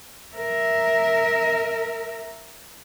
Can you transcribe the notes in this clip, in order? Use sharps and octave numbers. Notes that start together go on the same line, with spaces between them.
A#4 E5